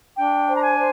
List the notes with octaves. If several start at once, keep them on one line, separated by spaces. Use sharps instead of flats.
D4 G5
C5
A#5
G#5
C5